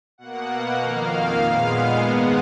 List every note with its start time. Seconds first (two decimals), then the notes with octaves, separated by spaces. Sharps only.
0.18 B2 A#3 F#5
0.48 F#5
0.78 F2 D#3 A#3 F5
1.38 A#2 G#3 B3
1.99 G#2 D#3 G#3 B3 F#5